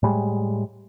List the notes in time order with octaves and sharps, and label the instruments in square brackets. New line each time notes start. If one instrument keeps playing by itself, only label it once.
[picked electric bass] A2 G3 G#3